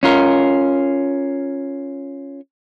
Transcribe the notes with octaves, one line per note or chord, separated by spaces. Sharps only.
C#4 F4 A#4